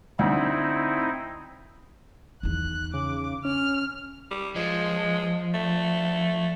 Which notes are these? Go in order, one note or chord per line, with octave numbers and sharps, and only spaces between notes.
D2 C4 D#4 E4
E2 D#3 F#6
C#3 D6
C#4 F6
G3
F3 G#3
A3